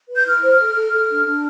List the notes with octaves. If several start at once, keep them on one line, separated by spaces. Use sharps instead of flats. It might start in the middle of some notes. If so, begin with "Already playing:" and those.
B4
G6
E4 F6
C5
A4
A4
A4
D4
D4